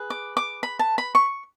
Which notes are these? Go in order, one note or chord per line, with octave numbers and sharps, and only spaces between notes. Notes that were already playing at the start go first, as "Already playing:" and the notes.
Already playing: G#4 B4
D6
D6
B5
A5
B5
C#6